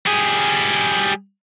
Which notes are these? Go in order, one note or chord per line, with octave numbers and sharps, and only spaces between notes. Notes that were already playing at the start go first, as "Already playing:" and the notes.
G3 G#4